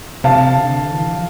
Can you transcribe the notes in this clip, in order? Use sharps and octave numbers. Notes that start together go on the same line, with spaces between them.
C3 F5 A5
D3
E3
F3